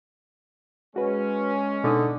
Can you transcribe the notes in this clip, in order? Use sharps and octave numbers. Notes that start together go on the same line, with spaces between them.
G#3 C#4 F#4 B4
B2 D3 D#4 D#6